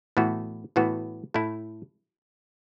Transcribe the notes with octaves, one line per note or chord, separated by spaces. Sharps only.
A2 E3 B3 F#4
A2 E3 B3 F#4
A2 A3 E4